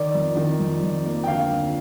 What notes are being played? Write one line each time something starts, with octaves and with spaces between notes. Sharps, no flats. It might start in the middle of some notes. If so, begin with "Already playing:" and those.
Already playing: D#3 D5
F2
D#3
F2
F2
A#3
G5
D2 F5
F3